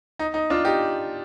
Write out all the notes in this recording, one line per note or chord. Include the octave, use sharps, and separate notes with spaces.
D#4
D#4
D4 F4
D#4 G4